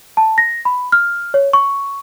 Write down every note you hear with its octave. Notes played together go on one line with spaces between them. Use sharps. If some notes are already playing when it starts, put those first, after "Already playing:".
A5
A#6
B5
F6
C#5
C#6